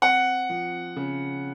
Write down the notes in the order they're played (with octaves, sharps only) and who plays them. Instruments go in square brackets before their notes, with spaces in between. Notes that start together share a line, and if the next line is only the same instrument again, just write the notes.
[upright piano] C4 [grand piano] F#5
[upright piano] F3
C#3